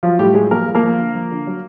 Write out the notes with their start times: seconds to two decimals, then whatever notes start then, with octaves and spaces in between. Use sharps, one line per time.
0.03 F3 F#3 F4
0.19 A2 G3 G4
0.34 F#3 G#3 G#4
0.51 F3 A#3 A#4
0.67 F3
0.75 A#3 A#4
0.83 F3
0.98 D3
1.15 F3
1.31 D3
1.47 F#3